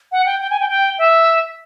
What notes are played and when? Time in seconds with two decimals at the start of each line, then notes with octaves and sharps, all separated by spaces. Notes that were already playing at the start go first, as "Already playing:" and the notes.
0.12 F#5
0.26 G5
0.41 G5
0.50 G#5
0.60 G5
0.70 G5
0.98 E5